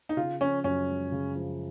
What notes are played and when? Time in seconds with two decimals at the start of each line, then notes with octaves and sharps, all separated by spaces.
0.09 D#4
0.17 C#3 F4
0.41 F3 C#4
0.64 F#2 C#4
0.88 G#3
1.12 C#3
1.35 F3